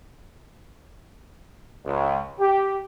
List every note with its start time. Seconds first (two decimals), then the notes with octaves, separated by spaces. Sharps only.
1.85 C#2
2.40 G4